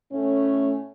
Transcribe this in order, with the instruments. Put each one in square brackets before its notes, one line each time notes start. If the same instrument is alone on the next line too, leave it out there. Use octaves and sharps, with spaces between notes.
[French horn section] A2 A3 C#4